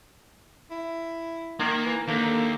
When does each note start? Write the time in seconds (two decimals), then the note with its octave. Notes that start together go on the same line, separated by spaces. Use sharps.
0.71 E4
1.60 D#3 A#3
1.86 E3
2.08 D#2 D3 A#3